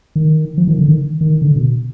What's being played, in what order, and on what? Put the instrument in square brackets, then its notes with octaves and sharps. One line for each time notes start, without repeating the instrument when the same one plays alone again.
[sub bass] D#3
F3
D#3
D3
D#3
D#3
D3
B2